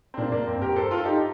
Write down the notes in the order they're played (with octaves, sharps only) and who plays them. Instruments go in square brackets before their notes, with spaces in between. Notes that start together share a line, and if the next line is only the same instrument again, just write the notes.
[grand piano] C4
[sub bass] A#2 [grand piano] A#3 D4
[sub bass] G2 [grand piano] A#3 D4
[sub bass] F2 [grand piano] C4
[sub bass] G2 [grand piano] G4 A#4
[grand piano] A4 C5
F4 A4
D#4 G4